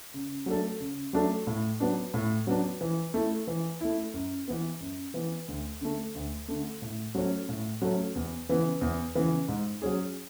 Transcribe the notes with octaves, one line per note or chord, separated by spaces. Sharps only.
C#3
F#3 A3 D4 A4
C#3
F#3 A3 D4 A4
A2
F#3 B3 D4
A2
F#3 B3 D4
E3
A3 E4
E3
A3 E4
F#2
E3 B3
F#2
E3 B3
D2
D3 A3
D2
D3 A3
A2
F#3 A3 C#4
A2
F#3 A3 C#4
E2
C#3 E3 B3
E2
C#3 E3 B3
G#2
F#3 C#4 G#4